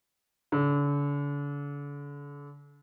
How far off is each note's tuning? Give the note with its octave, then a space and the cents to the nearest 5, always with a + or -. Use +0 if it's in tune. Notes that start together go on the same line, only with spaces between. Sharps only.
D3 -40